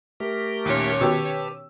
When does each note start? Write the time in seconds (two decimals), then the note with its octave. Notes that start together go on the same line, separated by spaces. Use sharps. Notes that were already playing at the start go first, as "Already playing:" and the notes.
0.20 A3 G4 A#4
0.66 D#2 A#2 C#4 C#5
1.01 B2 D#3 G4 B4 G5 A5 E6